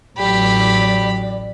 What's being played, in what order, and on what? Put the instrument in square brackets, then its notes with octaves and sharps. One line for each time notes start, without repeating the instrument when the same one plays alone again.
[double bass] A1 F#3 [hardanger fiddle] G4 B5 [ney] D5